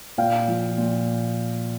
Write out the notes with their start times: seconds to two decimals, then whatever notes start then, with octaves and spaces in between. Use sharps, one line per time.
0.18 A#2 F5 G5
0.48 F3
0.78 A#2